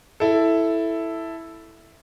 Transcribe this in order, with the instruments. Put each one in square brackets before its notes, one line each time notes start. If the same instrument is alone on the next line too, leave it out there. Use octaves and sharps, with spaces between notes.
[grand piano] E4 A4